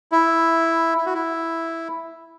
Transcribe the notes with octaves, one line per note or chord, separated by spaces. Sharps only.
E4
E4
F#4
E4